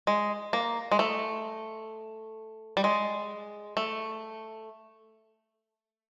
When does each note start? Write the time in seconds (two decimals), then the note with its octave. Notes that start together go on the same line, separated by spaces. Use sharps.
0.07 G#3
0.53 A#3
0.92 G#3
0.99 A3
2.77 G3
2.84 G#3
3.77 A3